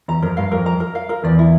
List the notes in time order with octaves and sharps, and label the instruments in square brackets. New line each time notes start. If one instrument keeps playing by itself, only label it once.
[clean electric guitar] E2 [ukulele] A#5
[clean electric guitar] F2 [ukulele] A#4
[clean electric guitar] G2 [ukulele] F5
[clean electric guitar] F2 [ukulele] A#4
[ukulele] A#5
A#4
F5
A#4
[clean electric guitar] E2 [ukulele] D5
[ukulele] E4